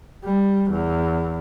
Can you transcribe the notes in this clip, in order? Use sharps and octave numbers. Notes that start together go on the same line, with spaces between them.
G3
E2